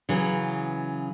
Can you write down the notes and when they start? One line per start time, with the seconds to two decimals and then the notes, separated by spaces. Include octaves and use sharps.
0.09 C#3 E3 F#3